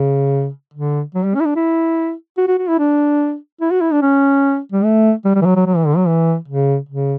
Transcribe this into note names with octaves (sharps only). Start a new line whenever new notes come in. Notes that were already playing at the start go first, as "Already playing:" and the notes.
Already playing: C#3
D3
F#3
G3
C#4
E4
D4
E4
F#4
F#4
F#4
E4
D4
E4
F#4
E4
D4
C#4
G3
A3
G3
G3
E3
F#3
F#3
F#3
E3
D3
F#3
E3
C#3
C#3